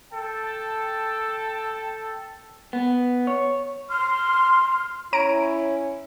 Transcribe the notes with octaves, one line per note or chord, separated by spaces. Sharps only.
A4 G5 A5
B3
C#5
C6 F6
C#4 E4 C#5 A#5 D7